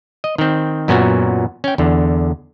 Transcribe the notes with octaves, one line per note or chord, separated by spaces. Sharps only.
D#5
D#3 C4
F#2 A#2 B3 C#4 F#4
C#4 G5
E2 D3